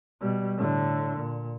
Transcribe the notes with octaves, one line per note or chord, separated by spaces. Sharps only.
B2 G3
A2 D3
A#2